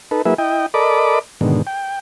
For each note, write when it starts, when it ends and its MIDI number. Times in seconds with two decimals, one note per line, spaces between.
0.11 0.22 63
0.11 0.22 69
0.11 0.22 71
0.25 0.34 54
0.25 0.34 58
0.25 0.34 64
0.25 0.34 68
0.25 0.34 71
0.25 0.34 76
0.38 0.66 64
0.38 0.66 75
0.38 0.66 79
0.74 1.19 69
0.74 1.19 70
0.74 1.19 74
0.74 1.19 75
0.74 1.19 83
0.74 1.19 86
1.41 1.62 44
1.41 1.62 47
1.41 1.62 50
1.41 1.62 51
1.67 1.99 79